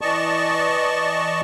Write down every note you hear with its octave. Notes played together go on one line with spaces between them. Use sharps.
E3 D5 D#5 A5 C#6